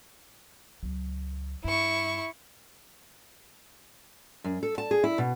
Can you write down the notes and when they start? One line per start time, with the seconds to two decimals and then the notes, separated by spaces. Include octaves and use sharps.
0.83 C#2 F#3
1.65 G2 E4 C#6
4.44 F#2
4.63 A4
4.78 A5
4.91 G#4
5.04 E4
5.18 B2